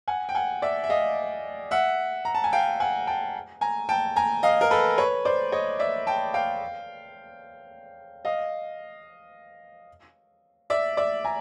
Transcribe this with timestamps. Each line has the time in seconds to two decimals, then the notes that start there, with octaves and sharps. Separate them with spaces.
0.08 F#5 G#5
0.29 G5
0.35 F#5 G#5
0.62 D5 E5
0.84 E5
0.89 D#5 F5
1.71 E5 F#5
2.25 A#5
2.35 A5
2.44 G#5
2.53 F5 G5
2.80 F#5 G#5
3.07 G5 A5
3.61 G#5 A#5
3.89 G5 A5
4.16 G#5 A#5
4.43 D#5 F5
4.61 A#4
4.71 A4 B4
4.98 B4 C#5
5.25 C5 D5
5.52 C#5 D#5
5.79 D5 E5
6.07 G5 A5
6.34 F5 G5
8.25 D#5 F5
10.70 D5 E5
10.97 D5 E5
11.25 G#5 A#5